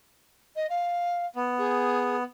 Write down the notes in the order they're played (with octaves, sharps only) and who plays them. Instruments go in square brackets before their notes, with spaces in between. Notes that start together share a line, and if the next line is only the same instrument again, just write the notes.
[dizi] D#5
F5
[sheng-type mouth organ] B3
[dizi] G#4